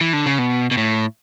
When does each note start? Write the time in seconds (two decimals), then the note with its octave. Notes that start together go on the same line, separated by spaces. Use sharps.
0.01 E3
0.13 D3
0.26 C#3
0.39 B2
0.71 B2
0.77 A2